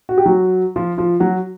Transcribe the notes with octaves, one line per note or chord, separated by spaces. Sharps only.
F#4
G4
F#3 F#4
F3 F4
F3 F4
F#3 F#4